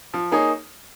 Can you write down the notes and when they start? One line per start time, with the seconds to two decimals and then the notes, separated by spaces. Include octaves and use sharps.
0.13 F3
0.32 A#3 D#4 G#4 C#5